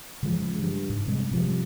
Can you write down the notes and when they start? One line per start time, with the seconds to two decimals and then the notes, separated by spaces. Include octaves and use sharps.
0.23 C#3 E3 F3 G#3
0.59 G2
0.90 G#2
1.07 C3 G3 G#3
1.31 C3 F3 G3